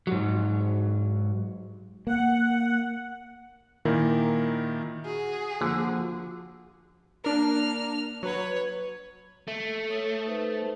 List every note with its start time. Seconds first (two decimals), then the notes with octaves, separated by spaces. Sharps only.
0.07 G#2 F#3
2.07 A#3 F#5
3.85 A#2 D#3 A#3 E4 A#4
5.05 F#4 G#4
5.61 D3 F3 A#3
7.24 A#3 D4 A#4 F6
8.23 F#3 B4 C#5
9.48 A3
9.88 A4 C#5 D#6
10.27 D#4 B4 C5